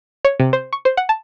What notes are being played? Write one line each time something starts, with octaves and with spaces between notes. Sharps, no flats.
C#5
C3
C5
C#6
C5
F#5
A5